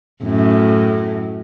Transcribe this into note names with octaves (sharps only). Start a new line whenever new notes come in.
F#2 A2